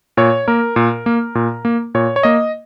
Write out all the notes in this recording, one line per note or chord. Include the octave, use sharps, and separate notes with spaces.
A#2 C#5
A#3 A#4
A#2
A#3
A#2
A#3
A#2 C#5
C#5
A#3 D#5